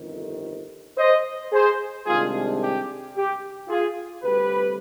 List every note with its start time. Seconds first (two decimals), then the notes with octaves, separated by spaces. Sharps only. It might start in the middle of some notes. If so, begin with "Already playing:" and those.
Already playing: G1 F2 C3 D#3
0.98 C5 D#5
1.52 G#4 C5
2.06 C2 C3 D#3 G#3 D4 F4 G#4
2.61 G4
3.15 G4
3.69 F4 G#4
4.22 D2 C3 G3 G4 B4